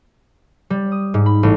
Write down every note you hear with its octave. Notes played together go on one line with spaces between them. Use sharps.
G3
D#6
G#2
B5
A1